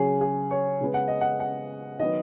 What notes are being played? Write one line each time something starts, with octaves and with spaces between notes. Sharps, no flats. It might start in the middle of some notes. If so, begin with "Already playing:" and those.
Already playing: C#3 F#3 C#4 G#4
G#4
C#5
C#3 G#3 B3
F#5
D#5
F#5
F#5
D#3 F#3 B3 D#5